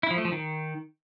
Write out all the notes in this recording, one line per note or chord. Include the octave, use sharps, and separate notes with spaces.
E4
F3
A3
F3
D#3